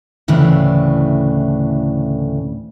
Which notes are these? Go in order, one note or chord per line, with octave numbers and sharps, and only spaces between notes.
D2 A2 C#3 E3 D4